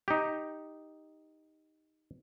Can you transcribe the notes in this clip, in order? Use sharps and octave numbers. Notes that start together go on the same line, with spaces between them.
D#4 G4